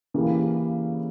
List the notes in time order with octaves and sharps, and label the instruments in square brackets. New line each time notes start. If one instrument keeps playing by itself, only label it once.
[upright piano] C#3 E3 A#3 E4 G4